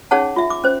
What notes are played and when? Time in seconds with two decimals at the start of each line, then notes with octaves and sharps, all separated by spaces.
0.11 C#4 D#4 G#4 C#5 F#5 A5
0.36 F4 E5
0.50 D6
0.64 C#4 C5